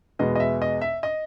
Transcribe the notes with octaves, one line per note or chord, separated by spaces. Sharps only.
E2 B2 G#3 B3 D#5
D#5
E5
D#5
E5
D#5